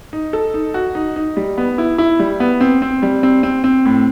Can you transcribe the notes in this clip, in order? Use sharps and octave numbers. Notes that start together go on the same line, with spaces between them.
D#4
A4
D#4
F#4
D#4
D#4
G3
B3
E4
E4
G3
B3
C4
C4
G3
C4
C4
C4
A2